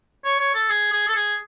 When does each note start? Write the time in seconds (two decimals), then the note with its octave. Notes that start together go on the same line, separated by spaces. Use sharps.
0.25 C#5
0.39 C#5
0.54 A4
0.70 G#4
0.92 G#4
1.08 A4
1.16 G#4